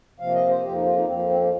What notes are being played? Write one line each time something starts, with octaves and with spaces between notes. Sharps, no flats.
C3 F3 A#3 F5
D#5
C5
F2 F3 A#3 G4
D#4
F4
D#4
F2 F3 A#3 C4
C4
C4
A#3